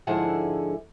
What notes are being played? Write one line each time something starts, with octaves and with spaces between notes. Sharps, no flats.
G#2 D3 F3 E4 G#4 F#5